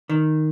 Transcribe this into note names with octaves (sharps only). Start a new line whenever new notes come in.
D#3